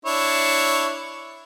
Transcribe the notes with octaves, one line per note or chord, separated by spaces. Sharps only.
D4 E4 C#5